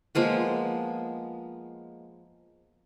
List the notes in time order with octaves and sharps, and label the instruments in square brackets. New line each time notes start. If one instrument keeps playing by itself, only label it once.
[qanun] F3 G#3 A#3 B3